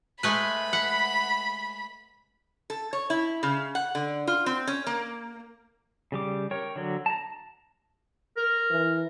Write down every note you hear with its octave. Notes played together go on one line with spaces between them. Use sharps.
G#3 A3 B4 B5
F#5
A4
C#5
E4
C#3
F#5
D3
F4
C4
C#4
A#3
C#3 G3 D6
A#4 C#5 G5 C#6
D3 F#3
A5 A#5
A#4
E3